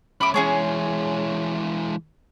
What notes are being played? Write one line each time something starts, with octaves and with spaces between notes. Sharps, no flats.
C#4 E5 B5 D6
E3 G#3 C#4 G#4 C#5